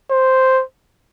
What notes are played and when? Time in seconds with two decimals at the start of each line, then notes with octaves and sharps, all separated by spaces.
0.11 C5